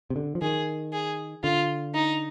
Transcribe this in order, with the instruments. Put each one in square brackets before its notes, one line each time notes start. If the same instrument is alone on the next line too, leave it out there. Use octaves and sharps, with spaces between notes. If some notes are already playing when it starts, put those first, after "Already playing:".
[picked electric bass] C3
D3
F3
[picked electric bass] D#3 [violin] G#4
[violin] G#4
[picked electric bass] D3 [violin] F4
[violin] D#4